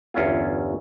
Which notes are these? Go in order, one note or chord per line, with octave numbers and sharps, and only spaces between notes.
G1 E2 C#4 E4 F4